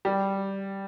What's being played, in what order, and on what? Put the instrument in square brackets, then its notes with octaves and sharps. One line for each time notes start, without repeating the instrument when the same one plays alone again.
[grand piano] G3